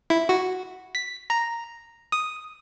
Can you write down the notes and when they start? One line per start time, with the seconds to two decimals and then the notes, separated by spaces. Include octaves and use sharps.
0.10 E4
0.29 F#4
0.95 B6
1.30 A#5
2.12 D#6